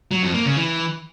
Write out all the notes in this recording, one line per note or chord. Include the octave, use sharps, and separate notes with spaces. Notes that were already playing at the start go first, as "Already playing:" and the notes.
F#3
F2
A#3
C#3
E3